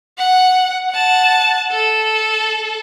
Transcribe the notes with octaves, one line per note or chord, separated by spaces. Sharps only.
F#5
F#5 A5
A4